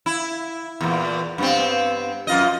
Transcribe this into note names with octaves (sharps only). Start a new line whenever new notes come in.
E4
E2 A#2
G2 B3 C4
F#2 F4 D#5